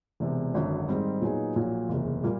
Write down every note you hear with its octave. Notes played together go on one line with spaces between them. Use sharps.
E1 E2 C3
G#1 F#2 D3
G#2 D#3 G3 C4 D#4
A#2 F#3 B3 D#4 G#4
A#1 A#2 F#3
F#1 E2 C3
A#2 G3 A#3